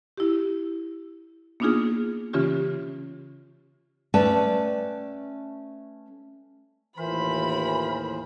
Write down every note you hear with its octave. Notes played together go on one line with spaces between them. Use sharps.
E4 G4
A#3 B3 D4 D#4 F4 G#4
C#3 E3 C#4 F4 G4
A3 C#4 B4 D5 G5 A5
D#2 A2 E3 F4 A#4 C5 E5 B5